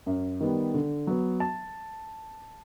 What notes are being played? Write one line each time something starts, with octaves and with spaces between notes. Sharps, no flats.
F#2
D#3 G3 B3
D3
F#3 B3
A5